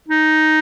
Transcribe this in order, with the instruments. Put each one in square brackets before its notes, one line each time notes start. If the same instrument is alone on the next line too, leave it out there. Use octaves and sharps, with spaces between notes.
[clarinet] D#4